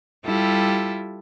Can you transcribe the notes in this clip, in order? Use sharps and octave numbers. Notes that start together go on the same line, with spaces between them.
G3 E4 F4 G4 A4